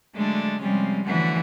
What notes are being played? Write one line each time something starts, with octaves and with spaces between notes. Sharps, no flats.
D3 F#3 G#3 A3 D4
C3 F3 G3 G#3 C#4
D3 E3 F3 A3 C#4 F#4